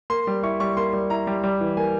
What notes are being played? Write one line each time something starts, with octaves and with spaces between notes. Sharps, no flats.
A#3 C6
G3
E4 C#6
G3 C#6
A#3 C6
G3
E4 A#5
G3
G3
E3
A#3 G#5